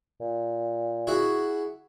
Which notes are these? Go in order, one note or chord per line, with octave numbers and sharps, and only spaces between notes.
A#2
E4 F#4 G#4